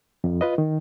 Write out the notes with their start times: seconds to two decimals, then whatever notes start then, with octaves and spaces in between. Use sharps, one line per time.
0.24 F2
0.41 F4 B4 D#5
0.58 D#3